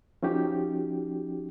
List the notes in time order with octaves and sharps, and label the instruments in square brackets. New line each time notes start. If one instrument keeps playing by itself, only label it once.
[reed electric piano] F3 C#4 D#4 F#4 G4